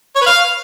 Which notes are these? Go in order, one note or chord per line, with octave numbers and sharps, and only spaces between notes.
C#5
B4
F5